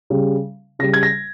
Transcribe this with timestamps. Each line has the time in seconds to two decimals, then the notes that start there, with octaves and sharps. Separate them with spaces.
0.10 C#3 G3
0.79 C#3 G3 A#6
0.94 G#6
1.03 A#6